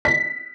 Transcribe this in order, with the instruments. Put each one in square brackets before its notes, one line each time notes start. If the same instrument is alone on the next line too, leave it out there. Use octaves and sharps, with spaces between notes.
[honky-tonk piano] B6